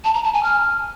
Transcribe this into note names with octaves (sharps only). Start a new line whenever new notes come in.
A5
A#5
A5
G#5
F6